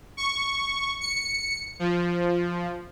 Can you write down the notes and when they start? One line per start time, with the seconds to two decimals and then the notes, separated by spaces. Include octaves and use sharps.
0.17 C#6
1.00 C#7
1.79 F3